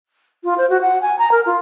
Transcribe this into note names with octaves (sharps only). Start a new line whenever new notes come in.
F4
C5
F#4
F#5
G#5
A#5
A#4
F4